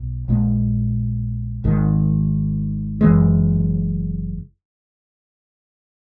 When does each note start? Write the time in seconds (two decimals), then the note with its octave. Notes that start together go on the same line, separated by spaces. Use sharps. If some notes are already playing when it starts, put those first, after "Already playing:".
Already playing: B1
0.28 A#1 A#2 G#3
1.64 G#1 G#2 D#3
3.01 F#1 F#2 E3 G#3